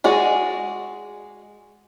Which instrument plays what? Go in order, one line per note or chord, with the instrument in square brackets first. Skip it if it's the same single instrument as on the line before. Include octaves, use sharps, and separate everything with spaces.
[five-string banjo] G#3 F#4 G#4 D5